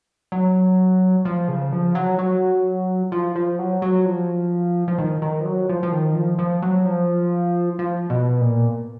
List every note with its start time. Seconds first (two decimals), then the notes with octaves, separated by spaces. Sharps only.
0.32 F#3
1.25 F3
1.48 C#3
1.72 F3
1.95 F#3
2.19 F#3
3.12 F3
3.36 F3
3.59 F#3
3.82 F#3
4.06 F3
4.88 F3
4.98 D#3
5.22 D#3
5.41 F3
5.45 F#3
5.69 F3
5.83 F3
5.92 D#3
6.15 F3
6.39 F3
6.62 F#3
6.85 F3
7.79 F3
8.10 B2
8.41 A#2